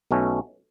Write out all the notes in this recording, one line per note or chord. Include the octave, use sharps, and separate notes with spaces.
B1 B2 A3 C#4